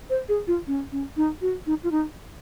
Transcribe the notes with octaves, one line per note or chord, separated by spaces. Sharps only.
C5
G#4
F4
C#4
C#4
D#4
F#4
D#4
F4
D#4